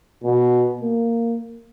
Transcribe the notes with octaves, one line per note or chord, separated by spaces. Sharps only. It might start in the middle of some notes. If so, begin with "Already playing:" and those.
B2
A#3